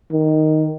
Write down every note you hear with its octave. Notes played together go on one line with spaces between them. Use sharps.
D#3